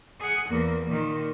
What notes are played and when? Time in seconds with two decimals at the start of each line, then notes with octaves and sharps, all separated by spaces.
0.20 G#4 F#5
0.48 E2 A#3
0.86 A#2 D#3